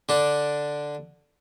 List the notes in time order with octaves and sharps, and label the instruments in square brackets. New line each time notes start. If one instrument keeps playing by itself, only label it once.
[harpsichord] D3 D4